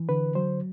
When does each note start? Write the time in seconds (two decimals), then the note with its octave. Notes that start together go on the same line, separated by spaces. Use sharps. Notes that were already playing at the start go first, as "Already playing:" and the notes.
Already playing: E3
0.09 D3 B4
0.35 F#3 C5